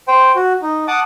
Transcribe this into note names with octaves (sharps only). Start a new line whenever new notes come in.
C5 G5
F#4
D#4
F#5 A5 D6 D#6